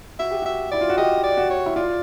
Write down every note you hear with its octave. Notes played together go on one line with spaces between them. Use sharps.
F#4 E5
G4
F#4 E5
E4 D5
F4
F#4
G4 D#5
D5
F#4
C#5
E4
F4 D5